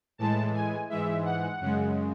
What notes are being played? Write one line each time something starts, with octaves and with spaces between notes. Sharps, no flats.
A2 E3 G#3 A5
G#5
G#2 E3 G#3 E5
F#5
F#2 C#3 G#3